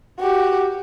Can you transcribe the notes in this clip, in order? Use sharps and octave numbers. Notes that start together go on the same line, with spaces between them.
F#4 G4